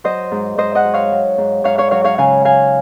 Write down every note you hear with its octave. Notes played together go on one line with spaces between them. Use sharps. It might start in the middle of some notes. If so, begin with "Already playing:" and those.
F#3 C5 D#5
G#2
G#2 C5 D#5
D#5 F#5
F#3
C#5 F5
F#3
G#2
G#2 C#5 F5
C#5 F5
F#3 C#5 F5
C#5 F5
C#3 F5 G#5
F#3 F5 G#5